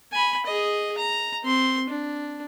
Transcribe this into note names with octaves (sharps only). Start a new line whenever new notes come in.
G#5 B5
G#4 D#5
A#5
C4 C6
D4